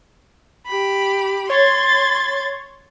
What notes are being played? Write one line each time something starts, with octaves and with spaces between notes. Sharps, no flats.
G4 B5
C#5 C6 G#6 A6